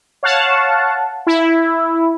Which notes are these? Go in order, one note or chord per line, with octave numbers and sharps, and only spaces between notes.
C#5 F5 F#5 A5
E4